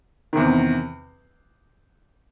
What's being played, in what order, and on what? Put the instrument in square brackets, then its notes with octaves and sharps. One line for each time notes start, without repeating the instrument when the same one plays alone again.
[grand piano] E2 C3 D#3